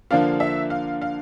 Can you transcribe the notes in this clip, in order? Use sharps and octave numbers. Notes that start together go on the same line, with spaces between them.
D3 F3 A#3 D4 F4 F5
E5
F5
F5